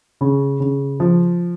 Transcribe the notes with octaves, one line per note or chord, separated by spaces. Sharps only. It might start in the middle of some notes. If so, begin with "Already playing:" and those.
C#3
C#3
F3